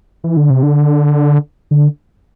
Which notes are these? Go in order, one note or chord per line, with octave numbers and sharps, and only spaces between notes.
E3
D3
C3
D3
D3